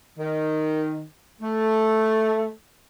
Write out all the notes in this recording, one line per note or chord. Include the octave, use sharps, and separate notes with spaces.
D#3
A3